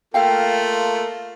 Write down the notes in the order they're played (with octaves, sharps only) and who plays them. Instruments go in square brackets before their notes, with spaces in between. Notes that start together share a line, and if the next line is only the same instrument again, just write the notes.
[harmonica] A3 A#3 F4 [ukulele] A4 F5 G5